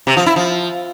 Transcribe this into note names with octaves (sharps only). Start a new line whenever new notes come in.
C3
F3
E4
F3